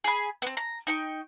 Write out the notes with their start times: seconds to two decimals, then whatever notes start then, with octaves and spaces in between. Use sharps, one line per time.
0.04 G#4 B5
0.42 B3 C4
0.57 A#5
0.87 D#4 G5 C#6